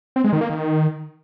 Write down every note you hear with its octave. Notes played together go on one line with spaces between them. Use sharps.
C4
G#3
D#3
A#3
D#3